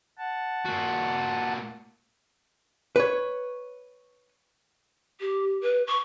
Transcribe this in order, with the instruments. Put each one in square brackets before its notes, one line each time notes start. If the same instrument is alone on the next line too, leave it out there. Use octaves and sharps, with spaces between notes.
[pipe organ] F#5 A5
[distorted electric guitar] A#2 F#4
[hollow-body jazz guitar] B4 C#5
[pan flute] G4
B4
C#6